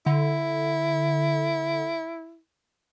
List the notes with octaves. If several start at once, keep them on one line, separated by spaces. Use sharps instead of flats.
D3 E4